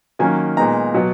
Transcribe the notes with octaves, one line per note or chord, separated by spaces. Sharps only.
D#3 F#3 A#3 C#4 G#5
A#2 G#3 B3 D#4 A#5
B2 F#3 B3